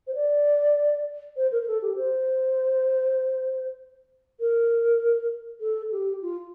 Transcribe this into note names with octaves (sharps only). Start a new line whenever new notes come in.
C5
D5
C5
A#4
A#4
A4
G4
C5
A#4
A4
G4
F4